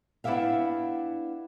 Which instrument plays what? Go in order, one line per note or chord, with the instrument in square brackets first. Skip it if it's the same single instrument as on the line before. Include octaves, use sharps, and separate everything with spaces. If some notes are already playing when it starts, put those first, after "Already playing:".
[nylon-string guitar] B3 D4 E4 G4 E5 F5